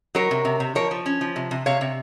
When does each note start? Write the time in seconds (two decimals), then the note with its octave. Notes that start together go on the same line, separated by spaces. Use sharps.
0.15 F#3 A#4 C#5
0.31 C3
0.45 C3
0.60 C3
0.75 F3 A#4 C#5
0.91 F3
1.06 C#4
1.21 F3
1.36 C3
1.51 C3
1.66 C3 C#5 F5
1.81 C3